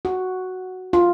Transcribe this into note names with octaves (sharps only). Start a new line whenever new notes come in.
F#4
F4